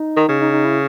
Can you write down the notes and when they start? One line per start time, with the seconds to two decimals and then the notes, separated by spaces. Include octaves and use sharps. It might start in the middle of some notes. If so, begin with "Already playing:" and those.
Already playing: D#4
0.17 D#3
0.28 C#3
0.41 D#4
0.52 D#4
0.65 E4